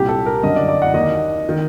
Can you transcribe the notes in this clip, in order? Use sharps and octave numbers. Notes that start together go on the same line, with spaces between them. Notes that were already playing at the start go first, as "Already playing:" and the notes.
Already playing: C2 A#2 G4
A4
A#4
G1 F#2 D3 D#5
D5
D5
F#5
D#2 D#3 D#5
D#3